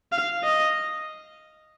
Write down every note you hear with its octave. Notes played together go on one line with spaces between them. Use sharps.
F5
D#5